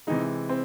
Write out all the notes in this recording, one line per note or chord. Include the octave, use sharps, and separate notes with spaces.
C3 E3 G#3 D#4
C4